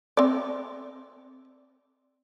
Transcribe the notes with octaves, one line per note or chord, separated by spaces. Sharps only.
C4 D5